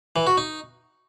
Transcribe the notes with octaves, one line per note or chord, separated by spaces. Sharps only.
E3
F#4
D#4